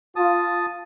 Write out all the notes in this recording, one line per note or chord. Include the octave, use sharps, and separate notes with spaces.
F4 A5 D#6